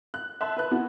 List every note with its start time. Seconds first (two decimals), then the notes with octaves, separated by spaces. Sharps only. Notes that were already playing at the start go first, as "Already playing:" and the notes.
0.14 F#6
0.41 E5 A5 C6 F#6
0.57 B4 F#6
0.71 B3 E4 F#4